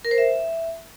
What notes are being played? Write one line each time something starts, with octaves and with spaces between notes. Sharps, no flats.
A#4
C5
E5